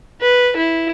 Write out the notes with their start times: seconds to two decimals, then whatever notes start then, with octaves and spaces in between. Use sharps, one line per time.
0.21 B4
0.57 E4